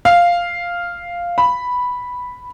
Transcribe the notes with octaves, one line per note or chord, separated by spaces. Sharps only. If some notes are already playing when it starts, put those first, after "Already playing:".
F5
B5